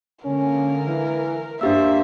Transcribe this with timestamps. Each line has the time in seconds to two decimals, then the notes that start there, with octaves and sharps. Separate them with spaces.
0.25 D3 G#3 A#3 C#4 A#4
0.87 E3
1.61 G2 A#3 D4 G4 C5 E5 E6